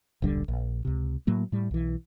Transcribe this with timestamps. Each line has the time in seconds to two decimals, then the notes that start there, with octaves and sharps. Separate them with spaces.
0.22 D#1 B1 D3 G3
0.48 A#1
0.85 C#2 C3
1.27 A2 F#3 A#3
1.52 A2 G3
1.71 B1 E3